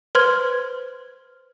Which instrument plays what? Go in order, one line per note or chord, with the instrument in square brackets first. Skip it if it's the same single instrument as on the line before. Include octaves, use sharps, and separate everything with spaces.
[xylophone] B4 C5 C6 F6 G#6